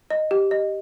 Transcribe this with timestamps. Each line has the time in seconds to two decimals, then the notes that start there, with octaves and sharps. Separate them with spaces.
0.11 D#5
0.31 G4
0.51 D#5